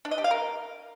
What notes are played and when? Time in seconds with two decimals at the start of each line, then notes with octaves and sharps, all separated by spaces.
0.05 D4
0.11 D#5
0.18 G4
0.24 F5
0.31 A#4